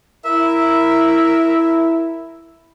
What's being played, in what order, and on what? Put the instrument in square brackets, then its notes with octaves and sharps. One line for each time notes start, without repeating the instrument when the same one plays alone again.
[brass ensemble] E4 [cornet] A#4 [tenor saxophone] E5